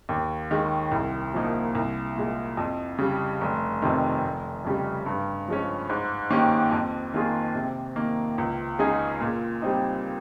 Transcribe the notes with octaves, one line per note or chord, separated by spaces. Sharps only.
D#2
D#3 G#3
C2
A#2 F3 A#3 D#4
C2
A#2 G#3
F2
C#3 G3
F1
F2 C3 D#3
F1
F2 C#3 G3
G2
F3 G#3 C#4
G#2
D#3 A#3 C#4 G4
F2
D#3 A#3 F4 G#4
C3
D#3 A#3
C#2
C#3 G#3 D#4 G#4
A#2
G3 C4 D#4